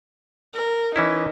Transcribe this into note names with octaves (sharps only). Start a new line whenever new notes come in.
A#4
E3 C#4 D#4 E4